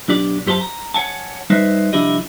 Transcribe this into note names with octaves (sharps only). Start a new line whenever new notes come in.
B1 D4 G4 D5
F#2 G4 C5 D5 A5
A#5
C#5 F#5 G#5 A5
G3 D#4 B4 C5 D#5 E5
C2 F3 D4 E4 G4 D#5